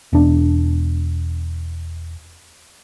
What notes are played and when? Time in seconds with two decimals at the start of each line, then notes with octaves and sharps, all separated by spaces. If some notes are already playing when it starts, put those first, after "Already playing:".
0.13 E1 D4